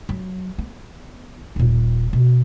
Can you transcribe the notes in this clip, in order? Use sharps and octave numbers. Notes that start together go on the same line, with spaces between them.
F#3
B3
D#1 A#2
B2